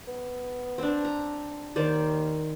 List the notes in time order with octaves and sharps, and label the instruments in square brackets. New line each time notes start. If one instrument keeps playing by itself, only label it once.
[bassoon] B3
[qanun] C4 D4
A#5
[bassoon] D#2 [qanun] D#3 C5 D5